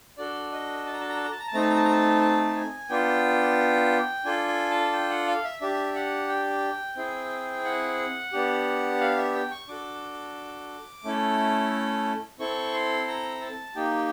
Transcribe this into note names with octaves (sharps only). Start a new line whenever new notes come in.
D4 F#4 A4 D5
D#5
A5
A#5
A5
A#5
A5
A#5
A5
A#5
A5
A3 C4 D#4 A#5
A5
A#5
A5
A#5
A5
A5
G#5
B3 D4 F4 G5
D4 F4 A4 G#5
G#5
A5
G5
F#5
F5
E5
D4 G4 E5
F#5
G5
C4 E4 G#4
F#5
B3 D4 G4
F5
E5
G5
C#6
D4 F#4 A4 D6
A3 C#4 E4 A4
C4 E4 A4 C#6
C6
A#5
A5
A#3 D#4 G4 G5